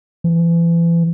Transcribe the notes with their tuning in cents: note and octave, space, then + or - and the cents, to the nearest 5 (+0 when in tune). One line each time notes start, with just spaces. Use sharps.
E3 +35